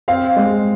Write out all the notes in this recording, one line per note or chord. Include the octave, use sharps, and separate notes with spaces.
C4 F5
G#3